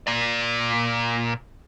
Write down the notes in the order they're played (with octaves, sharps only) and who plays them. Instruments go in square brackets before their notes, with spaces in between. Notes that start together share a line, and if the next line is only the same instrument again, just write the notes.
[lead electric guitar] A#2 D5